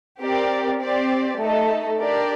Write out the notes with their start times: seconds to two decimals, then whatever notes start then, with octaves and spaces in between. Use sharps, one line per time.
0.22 C4 G4 A#4 D5
0.80 C4 G4 D5
1.41 A3 D#4 A4 D#5
1.99 D4 G4 A#4 D5